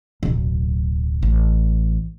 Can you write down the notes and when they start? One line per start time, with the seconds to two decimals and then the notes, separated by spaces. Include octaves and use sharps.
0.23 D1 B1
1.23 A1